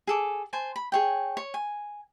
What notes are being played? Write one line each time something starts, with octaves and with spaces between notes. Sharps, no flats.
G#4 A4 D6
C5 G#5 A5
B5
G#4 C#5 G5
C#5
G#5